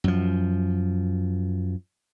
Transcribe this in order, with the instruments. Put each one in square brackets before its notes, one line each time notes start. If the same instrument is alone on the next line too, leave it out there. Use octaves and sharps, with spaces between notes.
[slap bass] F#2 F3